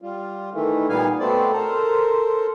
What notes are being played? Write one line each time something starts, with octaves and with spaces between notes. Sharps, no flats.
G3 F4
D#3 E3 A3
A#2 G3 B3 D#4 F5 G#5
B2 A3 B3 C4 C5 D5
A4 A#4 C5